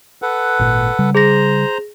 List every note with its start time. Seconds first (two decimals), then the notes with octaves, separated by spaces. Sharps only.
0.22 A4 B4 F#5
0.59 G#1 A#2
0.99 C#3 G3
1.15 G#4 C5 A#5 A#6